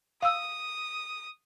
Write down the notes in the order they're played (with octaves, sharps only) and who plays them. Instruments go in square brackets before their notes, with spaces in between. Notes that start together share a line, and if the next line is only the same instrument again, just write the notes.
[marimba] F5 E6 [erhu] D#6